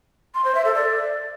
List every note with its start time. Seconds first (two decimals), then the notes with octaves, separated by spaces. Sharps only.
0.35 C6
0.45 C5
0.55 E5
0.65 A4
0.75 D5